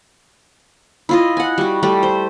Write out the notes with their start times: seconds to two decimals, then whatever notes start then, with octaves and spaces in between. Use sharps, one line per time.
1.09 E4 F4 D#5
1.37 F#5 G#5
1.58 G3 F#4
1.83 G3 A3
2.03 C5